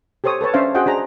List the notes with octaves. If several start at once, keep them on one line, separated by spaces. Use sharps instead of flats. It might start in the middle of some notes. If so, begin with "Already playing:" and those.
G4 A4 C5 C#5 D#6
A4 B4 C#5 A5
C#4 D4 C5 E5 F5
F#4 G#4 C5 D#5 F#5 G5
D4 G#4 C5 A#5